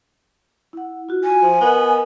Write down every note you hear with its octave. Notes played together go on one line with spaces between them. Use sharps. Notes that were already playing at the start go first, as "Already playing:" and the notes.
E4 F#5
F4 F#4
G#5
F3
B3 A#4 D#5